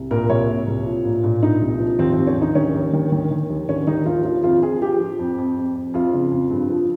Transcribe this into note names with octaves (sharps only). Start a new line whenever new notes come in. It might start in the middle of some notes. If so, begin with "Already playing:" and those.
Already playing: C2
A#2 A#4
C2 C#5
A#2
C2
F3
A#2
A#2
A#2 D#4
C2
F3
D#2 C4
C4
D#2
C#4
D#2
D#4
D#3 C#4
D#2
D#3
D#3
D#3
D#2
D#2 C#4
D#3 D#4
D#2 F4
F3 F4
F2 F4
F3 G#4
F3 G4
F3
F2
F2
F2
F2
F2 F4
C#3
F2
G2
F3